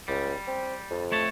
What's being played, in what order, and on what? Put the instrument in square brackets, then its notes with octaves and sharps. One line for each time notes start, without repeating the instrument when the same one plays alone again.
[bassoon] C#2 [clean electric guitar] G3
[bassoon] C4
F2
[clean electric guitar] A3 C#5 A5